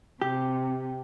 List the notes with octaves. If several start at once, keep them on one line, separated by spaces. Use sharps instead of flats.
C3 G4